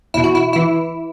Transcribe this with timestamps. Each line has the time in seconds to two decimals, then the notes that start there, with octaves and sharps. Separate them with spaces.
0.14 E2 B2 E4
0.24 F#4
0.35 E4
0.53 E3 E4